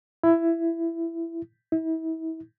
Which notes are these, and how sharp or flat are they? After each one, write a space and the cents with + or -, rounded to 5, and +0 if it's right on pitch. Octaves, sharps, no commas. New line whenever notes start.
E4 +15
E4 -35